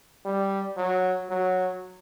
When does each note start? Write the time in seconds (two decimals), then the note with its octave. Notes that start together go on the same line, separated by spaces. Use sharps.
0.25 G3
0.77 F#3
1.30 F#3